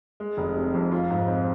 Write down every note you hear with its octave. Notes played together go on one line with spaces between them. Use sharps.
G#3
F1
C3
F2
F4
G#2
C4